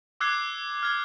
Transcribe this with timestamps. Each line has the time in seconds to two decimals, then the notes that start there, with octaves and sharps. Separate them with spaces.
0.20 D6 E6 F#6 G#6 C7
0.83 F6 G#6